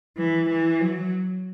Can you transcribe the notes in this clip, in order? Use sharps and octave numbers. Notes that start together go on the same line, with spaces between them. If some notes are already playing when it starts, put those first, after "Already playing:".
E3
E3
F#3